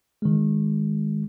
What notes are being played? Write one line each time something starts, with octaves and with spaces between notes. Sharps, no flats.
D#3 G#3